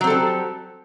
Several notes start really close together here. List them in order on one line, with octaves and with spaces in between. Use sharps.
F#3 C4 A4 G3